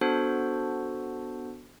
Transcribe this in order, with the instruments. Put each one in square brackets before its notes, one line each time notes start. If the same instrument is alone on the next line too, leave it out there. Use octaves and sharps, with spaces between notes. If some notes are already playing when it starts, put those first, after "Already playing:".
[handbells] B3 D4 F#4 A4 C5